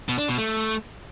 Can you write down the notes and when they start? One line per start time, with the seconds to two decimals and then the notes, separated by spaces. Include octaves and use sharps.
0.09 B2
0.19 D4
0.28 B2
0.38 A3